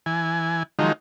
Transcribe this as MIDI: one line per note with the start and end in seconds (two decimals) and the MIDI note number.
0.06 0.63 52
0.06 0.63 80
0.79 0.92 51
0.79 0.92 53
0.79 0.92 54
0.79 0.92 56
0.79 0.92 63